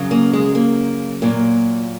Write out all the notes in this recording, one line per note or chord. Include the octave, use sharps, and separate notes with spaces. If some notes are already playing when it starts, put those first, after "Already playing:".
Already playing: F#2 C#3 F#3
A#3
G#3
A#3
A#2 F#3 A#3